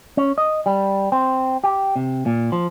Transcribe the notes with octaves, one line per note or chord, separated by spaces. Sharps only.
C#4
D#5
G3
C4
G4
C3
A#2
F3